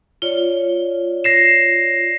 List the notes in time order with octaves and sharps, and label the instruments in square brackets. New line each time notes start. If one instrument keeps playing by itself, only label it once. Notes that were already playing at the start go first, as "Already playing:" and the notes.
[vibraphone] F4 C#5 D5 [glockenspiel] G7
[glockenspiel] A#6 C7 E7